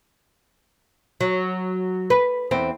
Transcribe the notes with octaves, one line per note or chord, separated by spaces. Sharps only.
F#3
B4
E2 C4